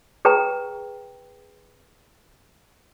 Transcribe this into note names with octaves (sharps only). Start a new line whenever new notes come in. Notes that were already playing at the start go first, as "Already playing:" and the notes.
G#4 B4 G5 A#5